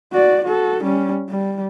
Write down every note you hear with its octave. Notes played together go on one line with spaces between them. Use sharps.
F#4 D5
F#4 A4
G3 C#4
G3